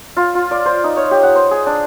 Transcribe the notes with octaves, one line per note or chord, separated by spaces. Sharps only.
F4
F4
D5
C5
D#4
C#5
G4
F#5
C5
G#4
D4